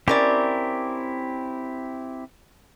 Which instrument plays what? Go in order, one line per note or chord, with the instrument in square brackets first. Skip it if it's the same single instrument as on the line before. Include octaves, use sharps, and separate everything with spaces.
[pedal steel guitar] C4 E4 G4 [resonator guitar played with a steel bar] C#4 A#4 D5